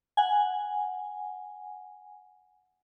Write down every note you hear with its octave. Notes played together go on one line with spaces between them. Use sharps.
F#5 G#5